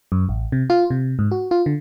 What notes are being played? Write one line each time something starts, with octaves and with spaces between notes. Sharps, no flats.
F#2
A1
C3
F4
C3
G#2
F#4
F4
D3